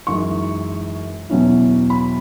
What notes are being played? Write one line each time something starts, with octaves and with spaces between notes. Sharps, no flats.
F#2 E3 G#3 D#4 C#6
E2 B2 F#3 C#4 E4
B5